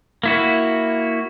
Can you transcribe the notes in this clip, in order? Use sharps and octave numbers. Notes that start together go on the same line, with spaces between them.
A#3 E4 F#4